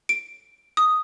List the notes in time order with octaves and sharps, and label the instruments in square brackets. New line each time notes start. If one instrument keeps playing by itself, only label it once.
[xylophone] D7
D#6